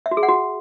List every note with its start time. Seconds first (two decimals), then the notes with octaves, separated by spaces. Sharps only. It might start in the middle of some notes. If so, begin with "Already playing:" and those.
0.06 E5
0.11 F#4
0.17 G#4
0.23 F#5
0.28 F#4